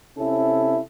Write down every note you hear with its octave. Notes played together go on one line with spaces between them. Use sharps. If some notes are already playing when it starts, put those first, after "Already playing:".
C3 C#4 E4 A4